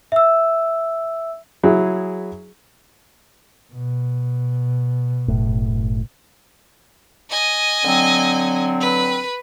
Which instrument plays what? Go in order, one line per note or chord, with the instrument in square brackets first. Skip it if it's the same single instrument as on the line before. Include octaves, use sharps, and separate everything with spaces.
[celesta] E5 E6
[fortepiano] F#3 E4 G#4
[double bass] B2
[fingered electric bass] F#1 A2
[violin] D#5 G#5
[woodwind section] D3 F#3 C4
[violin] B4